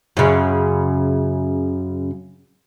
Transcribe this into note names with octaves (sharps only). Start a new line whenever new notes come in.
F#2 C#3